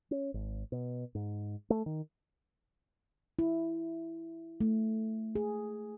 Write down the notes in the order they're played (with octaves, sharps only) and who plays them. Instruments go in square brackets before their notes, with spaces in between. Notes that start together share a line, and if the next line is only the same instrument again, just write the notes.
[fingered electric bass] C#4
G#1
B2
G#2
A3
D#3
[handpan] E4
A3
G#4